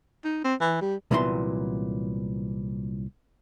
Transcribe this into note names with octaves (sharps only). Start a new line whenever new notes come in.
D#4
C4
E3
G3
C2 A#2 E3 F#3 B3 C6